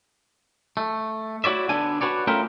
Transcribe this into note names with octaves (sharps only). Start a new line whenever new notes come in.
A3
E4 F#4 C#5 D5 E5
D3 B3 D4 A4 G#5
F#4 G#4 B4 C#5 D5
A3 C#4 F4 A#4 E5 G5